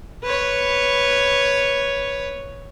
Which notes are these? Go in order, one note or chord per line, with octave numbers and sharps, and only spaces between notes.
B4 C#5